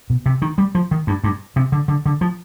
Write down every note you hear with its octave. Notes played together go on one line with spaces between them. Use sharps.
B2
C3
D#3
G3
F3
D#3
G2
G2
C3
D3
D3
D3
F3